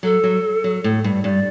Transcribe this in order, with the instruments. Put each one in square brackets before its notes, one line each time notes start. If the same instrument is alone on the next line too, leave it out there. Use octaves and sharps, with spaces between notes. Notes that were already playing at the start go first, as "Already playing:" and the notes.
[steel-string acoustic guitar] F#3 [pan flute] A4
[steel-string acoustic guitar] F#3
F#3
A2
G2
[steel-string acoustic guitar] G2 [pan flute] D5